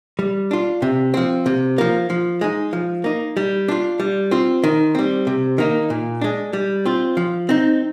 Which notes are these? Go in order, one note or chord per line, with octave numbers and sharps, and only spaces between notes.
G3
D4 F4
C3
F3 C4
C3
F3 A#3
F3
G#3 D#4
F3
A#3 D#4
G3
D4 F4
G3
C4 F4
D#3
G3 C4
C3
D#3 A#3 D#4
A#2
G#3 D4
G3
C4 F4
F3
C4 D#4